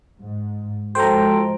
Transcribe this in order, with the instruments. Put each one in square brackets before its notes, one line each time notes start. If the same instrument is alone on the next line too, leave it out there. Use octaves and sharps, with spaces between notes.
[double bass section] G#2
[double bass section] F3 G#3 [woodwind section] F#4 A4 G5 [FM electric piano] C5 A#5